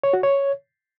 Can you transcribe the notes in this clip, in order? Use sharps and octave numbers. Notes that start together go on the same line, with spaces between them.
C#5
F#4
C#5